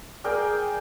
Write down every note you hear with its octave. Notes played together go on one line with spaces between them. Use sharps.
G#4 A#4 D5 G5